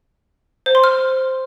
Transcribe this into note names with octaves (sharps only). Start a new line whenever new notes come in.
C5
C6
F6